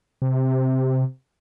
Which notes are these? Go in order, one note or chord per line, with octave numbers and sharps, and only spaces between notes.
C3